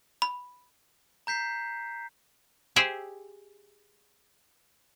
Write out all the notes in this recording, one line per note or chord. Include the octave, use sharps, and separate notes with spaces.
B5
A#5 G6 B6 C7
G4 G#4 C5 E5 G5